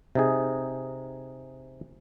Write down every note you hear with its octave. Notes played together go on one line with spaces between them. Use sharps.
C3 D#4 G#4